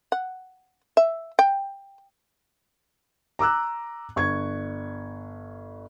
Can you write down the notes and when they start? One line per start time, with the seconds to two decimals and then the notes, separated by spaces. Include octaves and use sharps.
0.12 F#5
0.97 E5
1.39 G5
3.39 A#5 D6 E6 F#6
4.16 G1 C#6 G#6